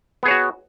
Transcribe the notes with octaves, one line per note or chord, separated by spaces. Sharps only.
B3 F#4 G#4 C#5